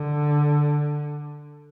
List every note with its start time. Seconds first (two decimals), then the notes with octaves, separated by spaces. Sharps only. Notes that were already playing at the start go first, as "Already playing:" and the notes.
Already playing: D3